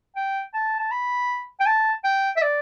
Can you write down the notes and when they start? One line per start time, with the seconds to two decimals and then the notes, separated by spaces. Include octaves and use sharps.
0.16 G5
0.54 A5
0.79 A5
0.91 B5
1.60 G5
1.66 A5
2.04 G5
2.37 E5
2.42 D5